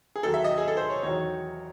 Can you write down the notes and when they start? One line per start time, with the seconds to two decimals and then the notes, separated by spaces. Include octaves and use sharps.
0.16 G#4
0.23 D#2 D#3 F#3 A4
0.34 E5
0.44 D#5
0.58 G#4
0.68 A4
0.77 C5
0.90 C#5
1.03 E2 D#3 F#3 C#5